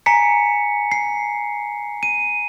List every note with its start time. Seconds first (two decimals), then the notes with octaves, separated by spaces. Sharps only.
0.06 G#5 A#5 B6 C#7
0.92 C7
2.03 D#7